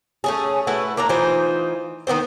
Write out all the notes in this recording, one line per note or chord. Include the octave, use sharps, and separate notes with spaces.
A3 C#4 G#4
A3 E4 F#4 B4
A#3 D4 E4 A#5
E3 D#4 F4 C5
D#3 B3 C4 C5